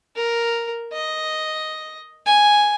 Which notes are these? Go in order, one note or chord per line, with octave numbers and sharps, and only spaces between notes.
A#4
D#5
G#5